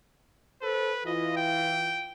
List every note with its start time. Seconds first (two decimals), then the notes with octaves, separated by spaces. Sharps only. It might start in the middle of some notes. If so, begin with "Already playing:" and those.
0.62 A4 B4 C5
1.06 E3 E4 F4 D#5
1.37 G5